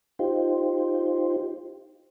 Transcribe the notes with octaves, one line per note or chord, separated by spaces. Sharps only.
D#4 F4 G4 C5